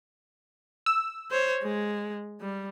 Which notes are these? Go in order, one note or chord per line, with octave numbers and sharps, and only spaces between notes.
E6
C5 C#5
G#3
G3